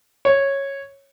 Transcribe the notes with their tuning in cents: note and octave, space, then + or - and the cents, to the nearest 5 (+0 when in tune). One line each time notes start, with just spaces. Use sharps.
C#5 -10